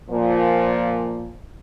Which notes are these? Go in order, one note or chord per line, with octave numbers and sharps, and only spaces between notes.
A#2 F3